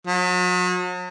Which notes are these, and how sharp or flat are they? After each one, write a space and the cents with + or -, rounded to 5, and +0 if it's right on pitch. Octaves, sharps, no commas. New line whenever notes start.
F#3 -40